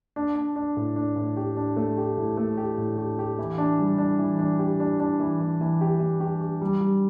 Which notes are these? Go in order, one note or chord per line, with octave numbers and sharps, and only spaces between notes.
D4
D4
D4
A2
D4
A2
G4
D4
A3
G4
A2
A3
G4
A2
G4
G4
E3
D4
G3
D4
E3
D4
G4
D4
D4
E3
E3
E3
G4
E3
G4
G4
G3
G3